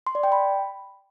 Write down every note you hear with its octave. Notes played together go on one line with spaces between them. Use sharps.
C6
D5
G5
B5